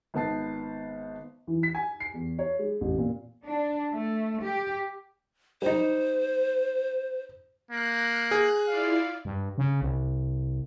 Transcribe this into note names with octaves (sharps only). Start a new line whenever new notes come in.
G#1 B3 A5 C7
E3
B6
G#5
C7
E2
C#5
G#3
A1
A#2
D4
A3
G4
G3 D#4 C5
A#3 F#6
G#4
E4 F4 D5 F5
G2
C#3
C2